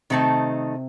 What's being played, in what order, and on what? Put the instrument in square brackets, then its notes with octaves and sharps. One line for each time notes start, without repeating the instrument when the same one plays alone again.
[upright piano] C3 [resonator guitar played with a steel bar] D#3 A3 C4 D#4 A4